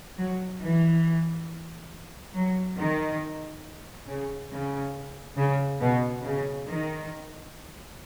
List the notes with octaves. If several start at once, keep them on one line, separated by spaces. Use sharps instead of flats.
F#3
E3
F#3
D#3
C#3
C#3
C#3
B2
C#3
D#3